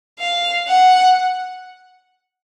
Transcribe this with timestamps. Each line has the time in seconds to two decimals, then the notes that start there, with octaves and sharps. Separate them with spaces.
0.19 F5
0.68 F#5